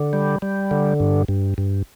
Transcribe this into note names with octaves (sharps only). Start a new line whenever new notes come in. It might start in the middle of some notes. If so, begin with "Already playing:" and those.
Already playing: D3
G3
G3
D3
G2
G2
G2